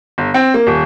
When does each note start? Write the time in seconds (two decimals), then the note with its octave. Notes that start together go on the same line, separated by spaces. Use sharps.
0.18 G1
0.34 C4
0.54 A#3
0.67 D#1